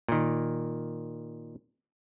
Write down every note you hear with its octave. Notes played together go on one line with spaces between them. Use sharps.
A#2 D#3